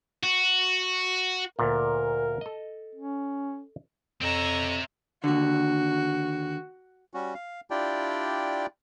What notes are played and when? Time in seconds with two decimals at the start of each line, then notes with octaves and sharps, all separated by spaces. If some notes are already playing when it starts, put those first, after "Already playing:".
0.23 F#4
1.59 D2 A#2 A#4
2.41 A4 D#5
2.95 C#4
4.22 F2 C4 C#5 E5 A#5
5.24 D#2 D3 F#4
7.14 G3 C#4 F#4
7.35 F5
7.70 D4 E4 F4 G4 D5 G5